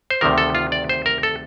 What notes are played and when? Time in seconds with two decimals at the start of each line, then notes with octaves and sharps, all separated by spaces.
0.10 C5
0.21 D2 C3 D#3 G3 A#4
0.38 A4
0.55 F4
0.72 D5
0.89 C5
1.06 A#4
1.23 A4